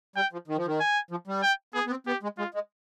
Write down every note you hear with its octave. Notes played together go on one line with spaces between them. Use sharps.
G3 G5
F3
D#3
F3
D#3
G#5
F3
G3
G5
B3 G#4
B3
C4
B3 G4
G#3
G#3 F4
G#3